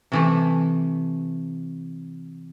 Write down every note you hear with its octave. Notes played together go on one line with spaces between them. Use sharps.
C3 E3 A3